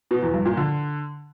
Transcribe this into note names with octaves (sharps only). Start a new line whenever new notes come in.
B2
E2
G2
A#2
D3